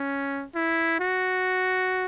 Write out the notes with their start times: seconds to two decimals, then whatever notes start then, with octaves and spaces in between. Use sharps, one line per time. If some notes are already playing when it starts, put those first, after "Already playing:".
Already playing: C#4
0.55 E4
0.99 F#4